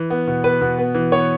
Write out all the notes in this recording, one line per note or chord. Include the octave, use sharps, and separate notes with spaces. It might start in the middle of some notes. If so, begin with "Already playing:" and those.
Already playing: E3
B3
B2
B3 B4
B2
B3
E3
B3 C#5